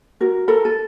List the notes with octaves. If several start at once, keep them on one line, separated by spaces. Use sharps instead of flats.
F#4 A#4
A4 A#4 B5
A4